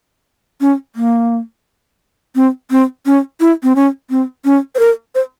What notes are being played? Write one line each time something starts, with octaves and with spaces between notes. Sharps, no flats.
C#4
A#3
C4
C4
C#4
E4
C4
C#4
C4
C#4
C5
A#4
C5